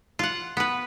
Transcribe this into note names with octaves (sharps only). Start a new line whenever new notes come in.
F4 F#5
B3 B4